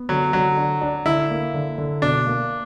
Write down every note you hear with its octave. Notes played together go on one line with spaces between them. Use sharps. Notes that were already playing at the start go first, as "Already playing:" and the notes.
Already playing: B3
D3 F#3
D3 F#3
D4
D4
D3 E4
A#3
D3
D3
B2 D4
A#3